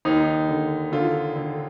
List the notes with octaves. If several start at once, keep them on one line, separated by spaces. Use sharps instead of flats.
D#2 D#4
D3
D3 F4
D3